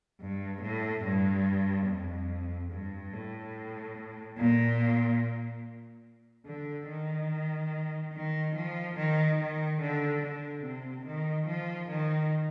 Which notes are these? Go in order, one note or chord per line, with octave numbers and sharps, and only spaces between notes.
G2
A2
G2
F2
G2
A2
A#2
D3
D#3
D#3
F3
D#3
D#3
D3
D3
C3
D#3
F3
D#3